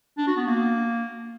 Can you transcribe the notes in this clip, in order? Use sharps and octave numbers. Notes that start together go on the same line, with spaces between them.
D4
F#4
B3
A#3